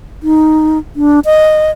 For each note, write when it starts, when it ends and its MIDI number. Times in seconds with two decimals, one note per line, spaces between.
0.23 0.78 63
0.96 1.20 62
1.25 1.71 75